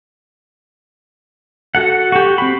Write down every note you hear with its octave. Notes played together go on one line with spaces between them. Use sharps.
F#4 A4 F#5
F#4 G4
C4 B5